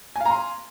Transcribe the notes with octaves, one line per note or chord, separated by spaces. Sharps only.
F5 G#5 A#5 C6